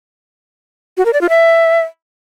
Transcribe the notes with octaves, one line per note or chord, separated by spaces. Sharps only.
F#4
A#4
D5
F4
E5